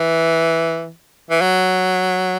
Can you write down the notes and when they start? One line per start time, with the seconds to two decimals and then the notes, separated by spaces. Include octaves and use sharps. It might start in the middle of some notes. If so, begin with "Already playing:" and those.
Already playing: E3
1.31 E3
1.42 F#3